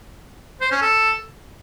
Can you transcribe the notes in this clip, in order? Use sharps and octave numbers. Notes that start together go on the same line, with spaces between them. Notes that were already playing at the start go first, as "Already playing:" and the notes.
C5
C#4
A4